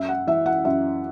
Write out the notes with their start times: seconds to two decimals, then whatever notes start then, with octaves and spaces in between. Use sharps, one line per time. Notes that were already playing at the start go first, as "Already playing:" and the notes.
Already playing: F#2 E5
0.09 F#5
0.27 E3 E5
0.46 F#5
0.65 F#2 E5